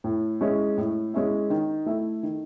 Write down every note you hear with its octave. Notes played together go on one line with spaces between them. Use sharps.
A2
G#3 C#4 E4
A2
G#3 C#4 E4
D#3
A3 E4
D#3